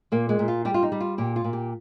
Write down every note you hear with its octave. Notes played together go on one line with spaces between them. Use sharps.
A#2 A#3
G#3
A#2
F4
G3 G4
F4
D#4
G3
F4
A#2 G4
F4
A#2
G4